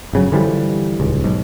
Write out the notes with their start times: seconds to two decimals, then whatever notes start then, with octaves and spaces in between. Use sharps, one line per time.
0.13 G1 C#3 F#3
0.32 D3 E3 F3 G3
1.00 D#1 C#2
1.24 B1 G#2